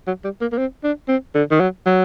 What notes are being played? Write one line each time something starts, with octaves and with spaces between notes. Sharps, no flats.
F#3
G3
A#3
A#3
C4
D4
C4
D3
D#3
F#3
F#3